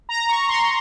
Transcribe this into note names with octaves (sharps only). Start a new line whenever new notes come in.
A#5
C#6
C6